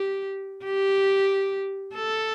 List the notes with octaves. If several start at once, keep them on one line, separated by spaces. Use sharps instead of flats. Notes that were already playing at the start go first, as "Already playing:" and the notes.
Already playing: G4
G4
A4